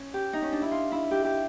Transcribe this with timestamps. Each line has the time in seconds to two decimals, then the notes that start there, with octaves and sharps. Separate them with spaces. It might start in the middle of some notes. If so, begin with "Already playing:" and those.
Already playing: C#4
0.14 G4
0.33 D#4
0.42 C#4
0.52 D4
0.62 E4
0.71 F4
0.92 E4
1.11 G4
1.24 G4